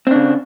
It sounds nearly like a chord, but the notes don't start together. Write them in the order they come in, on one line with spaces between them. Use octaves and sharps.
C4 D4 C#3